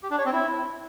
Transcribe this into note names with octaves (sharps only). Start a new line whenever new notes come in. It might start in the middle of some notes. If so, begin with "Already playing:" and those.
G4
D4
C#5
C4
E4